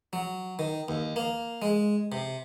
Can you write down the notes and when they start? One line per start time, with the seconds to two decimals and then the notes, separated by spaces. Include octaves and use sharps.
0.13 F#3
0.59 D#3
0.88 D#2
1.16 A#3
1.62 G#3
2.12 C3